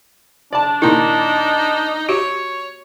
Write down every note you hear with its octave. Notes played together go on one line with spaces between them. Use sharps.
D4 D5 A5
A#2 D#3 D#4 E4 A#5
F#4 G4 C#5